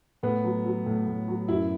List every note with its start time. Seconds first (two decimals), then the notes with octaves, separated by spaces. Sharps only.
0.23 A2 B3
0.44 F#3
0.65 F#3
0.86 A2
1.07 A2
1.28 F#3
1.48 F#2 E4